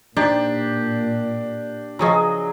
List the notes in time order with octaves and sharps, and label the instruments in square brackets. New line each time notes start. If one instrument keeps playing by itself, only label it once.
[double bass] A#2 [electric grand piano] D4 [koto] D#4 C5 D5 [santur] G4
[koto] C#3 F3 C#4 [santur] F#3 G#4 D#5